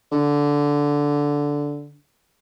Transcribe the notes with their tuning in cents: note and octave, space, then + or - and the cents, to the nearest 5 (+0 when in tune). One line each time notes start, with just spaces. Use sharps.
D3 -10